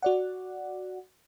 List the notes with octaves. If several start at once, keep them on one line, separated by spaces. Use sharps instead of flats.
F#4 D5 F#5